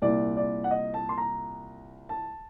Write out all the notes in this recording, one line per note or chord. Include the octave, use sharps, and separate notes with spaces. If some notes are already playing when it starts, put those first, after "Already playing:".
C2 A#2 D5
D5
F#5
D#5
A5
C6
A#5
A5